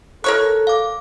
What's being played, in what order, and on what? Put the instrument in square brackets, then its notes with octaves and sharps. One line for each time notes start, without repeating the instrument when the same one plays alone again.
[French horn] A4 [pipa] A#4 C#5 C#6 [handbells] F#6
[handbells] F5 D6